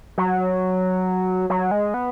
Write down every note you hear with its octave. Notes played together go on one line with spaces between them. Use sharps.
F#3
F#3
G#3
B3